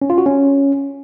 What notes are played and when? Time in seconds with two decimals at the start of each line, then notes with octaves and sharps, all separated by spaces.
0.02 C#4
0.10 F4
0.18 F#4
0.26 C#4